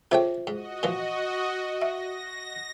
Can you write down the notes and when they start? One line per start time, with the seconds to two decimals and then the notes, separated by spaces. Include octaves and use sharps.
0.11 C#3 A3 F4 C5 E5 G5
0.47 G#2 F#4 D#5
0.83 A#2 E3 F3
1.81 E5 A#6